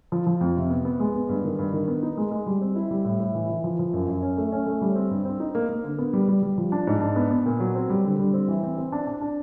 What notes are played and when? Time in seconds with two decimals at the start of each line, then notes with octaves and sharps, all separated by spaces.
0.12 F3
0.27 F3
0.41 F2
0.56 C3
0.70 B3
0.85 B3
1.00 G#3
1.15 B3
1.29 G2
1.44 D#3
1.59 G2
1.73 D#3
1.88 B3
2.03 D#4
2.17 G#3
2.31 G#3
2.46 G3
2.61 C4
2.76 E4
2.91 G3
3.05 A2
3.20 A2
3.35 E3
3.49 E3
3.64 F3
3.79 F3
3.93 F#2
4.08 F#2
4.22 C#4
4.37 A3
4.52 C#4
4.67 A3
4.81 G3
4.96 C4
5.11 G2
5.25 C4
5.40 D#4
5.55 A#3
5.69 A#3
5.84 D3
5.98 B3
6.13 G3
6.28 G3
6.42 G3
6.58 F3
6.72 D4
6.87 G#2
7.01 D4
7.16 B3
7.31 B3
7.46 A#2
7.60 F#3
7.75 C4
7.89 G3
8.04 D3
8.19 G3
8.34 C4
8.48 E3
8.63 C4
8.77 C4
8.92 D4
9.07 D4
9.21 D4